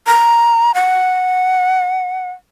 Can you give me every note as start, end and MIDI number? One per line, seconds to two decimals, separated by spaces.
0.07 0.72 82
0.75 2.31 78